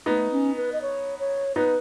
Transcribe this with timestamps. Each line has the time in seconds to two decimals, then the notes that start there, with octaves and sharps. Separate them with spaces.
0.06 A3 B3 D#4
0.32 C#4
0.56 B4
0.72 D#5
0.82 C#5
1.19 C#5
1.56 B3 D#4 B4